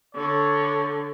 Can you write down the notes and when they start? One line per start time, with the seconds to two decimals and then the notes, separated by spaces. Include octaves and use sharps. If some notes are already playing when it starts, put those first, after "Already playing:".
0.15 D3 C#5